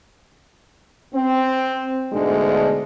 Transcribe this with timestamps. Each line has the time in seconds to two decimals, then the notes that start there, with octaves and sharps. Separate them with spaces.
1.15 C4
2.12 D2 G#2 B2 D3 G#3